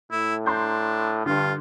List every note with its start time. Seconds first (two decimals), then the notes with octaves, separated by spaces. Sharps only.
0.11 A2 E4
0.46 D4 A#5 C6 G6
1.26 G2 D3 F4